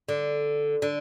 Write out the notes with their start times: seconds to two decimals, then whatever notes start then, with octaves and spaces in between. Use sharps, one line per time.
0.09 D3
0.82 D3